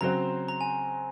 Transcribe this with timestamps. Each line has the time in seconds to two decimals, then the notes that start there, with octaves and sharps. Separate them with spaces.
0.01 C#3 F#3 C4 F#4 C5 A#5
0.48 A#5
0.61 G#5